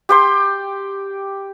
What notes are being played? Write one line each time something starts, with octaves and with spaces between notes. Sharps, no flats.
G4 G5 C6